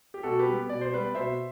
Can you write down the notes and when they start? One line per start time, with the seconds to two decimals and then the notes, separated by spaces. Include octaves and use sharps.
0.14 G4
0.23 B2 F#4 A4
0.39 G4 B4
0.46 G3 B3
0.69 B2 D5
0.81 C5
0.93 G3 B3 B4 D5
1.15 B2 C5 E5